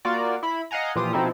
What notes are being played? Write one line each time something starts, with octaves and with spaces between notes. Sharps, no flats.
A#3 F4 F#4 A#4 D5
E4 B5
D#5 F5 F#5 G#5 A#5
A#2 E3 F3 F4 G4 D#6
B2 F3 C4 D#4 E4 A4